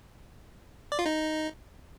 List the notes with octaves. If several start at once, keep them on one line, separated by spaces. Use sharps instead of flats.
D5
F4
D#4